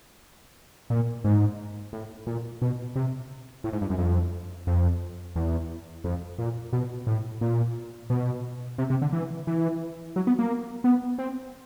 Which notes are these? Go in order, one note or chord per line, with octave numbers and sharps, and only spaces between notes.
A#2
G#2
A2
A#2
B2
C3
A2
G#2
G2
F#2
F2
F2
E2
F2
A#2
B2
A2
A#2
B2
C3
C3
D3
E3
E3
F#3
B3
A#3
B3
C4